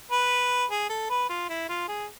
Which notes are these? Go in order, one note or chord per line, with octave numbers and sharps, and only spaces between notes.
B4
G#4
A4
B4
F4
E4
F4
G#4